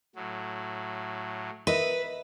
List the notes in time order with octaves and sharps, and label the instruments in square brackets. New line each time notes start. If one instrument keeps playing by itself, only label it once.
[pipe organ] A2 F#3
[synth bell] A#4 D#5 E5 [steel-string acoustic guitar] B4